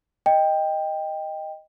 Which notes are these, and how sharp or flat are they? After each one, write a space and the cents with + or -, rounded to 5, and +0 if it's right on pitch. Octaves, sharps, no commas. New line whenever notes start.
D#5 +0 G5 +10